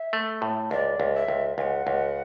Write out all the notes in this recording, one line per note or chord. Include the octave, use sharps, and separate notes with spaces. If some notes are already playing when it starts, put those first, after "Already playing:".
Already playing: E5
A3
A2
C#2 D5
C#2
E5
C#2
C#2 F#5 G#5
C#2